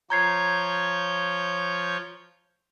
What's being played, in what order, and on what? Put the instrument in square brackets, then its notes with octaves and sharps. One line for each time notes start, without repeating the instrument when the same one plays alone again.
[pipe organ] F3 C#5 G6 [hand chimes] A#5 G#6 C7